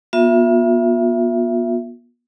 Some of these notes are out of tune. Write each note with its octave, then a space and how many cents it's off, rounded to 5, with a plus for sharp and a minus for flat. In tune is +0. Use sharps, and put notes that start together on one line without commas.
B3 -40 F4 +35 E5 +20